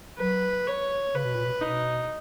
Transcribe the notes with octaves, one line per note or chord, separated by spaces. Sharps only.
F#3 B4
C#5
C#3 B4
B2
A#2
B2
B2 D#4